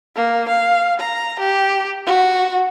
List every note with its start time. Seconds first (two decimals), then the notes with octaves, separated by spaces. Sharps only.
0.16 A#3
0.48 F5
0.99 A#5
1.39 G4
2.06 F#4